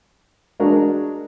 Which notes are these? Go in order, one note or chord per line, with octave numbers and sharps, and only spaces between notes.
G#3 D4 F#4 A#4